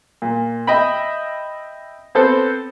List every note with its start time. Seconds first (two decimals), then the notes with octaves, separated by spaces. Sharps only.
0.22 A#2
0.67 D#5 E5 G5 B5
2.15 B3 C4 A4 C5